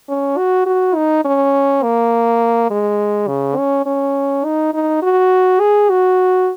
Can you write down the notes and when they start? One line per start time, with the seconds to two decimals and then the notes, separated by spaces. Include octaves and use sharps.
0.09 C#4
0.37 F#4
0.66 F#4
0.95 D#4
1.25 C#4
1.83 A#3
2.70 G#3
3.27 C#3
3.57 C#4
3.86 C#4
4.45 D#4
4.74 D#4
5.02 F#4
5.60 G#4
5.90 F#4